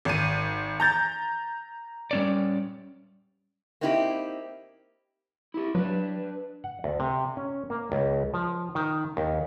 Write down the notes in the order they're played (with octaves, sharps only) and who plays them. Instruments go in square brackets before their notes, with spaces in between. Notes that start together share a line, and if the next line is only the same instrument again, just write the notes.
[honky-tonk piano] G#1 D#7
A#5 G6 A6
[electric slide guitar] G3 C#4 D5
[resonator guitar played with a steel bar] A#3 C4 D#4 E4 F#4 G4
[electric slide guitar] E4 G4
[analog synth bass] F#3 [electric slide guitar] D4 B4
[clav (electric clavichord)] F#5
D2
C3
C#4
A#3
C#2
F3
D#3
D#2